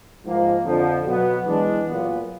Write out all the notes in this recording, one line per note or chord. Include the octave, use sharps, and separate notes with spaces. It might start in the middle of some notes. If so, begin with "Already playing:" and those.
G#2 F3 A#3
F2 D3 F3
B2 F#3 B3
E3 G#3 B3 D4
A#2 F#3 B3